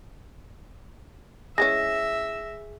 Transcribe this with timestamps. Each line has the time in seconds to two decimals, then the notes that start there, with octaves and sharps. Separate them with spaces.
1.58 E3 G#3 C#4 G#4 E5 A#6